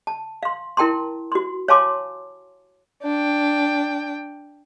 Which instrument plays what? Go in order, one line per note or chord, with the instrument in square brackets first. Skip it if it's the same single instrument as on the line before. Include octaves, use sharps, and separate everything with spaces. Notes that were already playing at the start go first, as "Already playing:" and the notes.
[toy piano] A5
F5 C6
E4 A#4 G5 A5 A#5 C6
F#4 C6
C#5 F5 G#5 A5 C6 D6
[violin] D4 G5